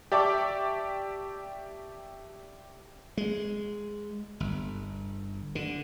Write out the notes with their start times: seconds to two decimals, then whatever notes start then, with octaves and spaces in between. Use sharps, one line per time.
0.12 G4 D5 E5 A5 C#6 D6
3.17 G#3
4.40 G1
5.55 D3